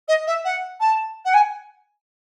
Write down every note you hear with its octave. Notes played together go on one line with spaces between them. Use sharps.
D#5
E5
F#5
A5
F#5
G#5